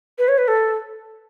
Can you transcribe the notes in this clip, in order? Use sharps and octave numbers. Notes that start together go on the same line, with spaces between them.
B4
C#5
B4
A4